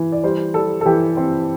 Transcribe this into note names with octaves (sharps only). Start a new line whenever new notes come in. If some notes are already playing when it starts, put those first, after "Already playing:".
Already playing: E3
D5
G3 C5
G3 A4
A4
E3 G4
C4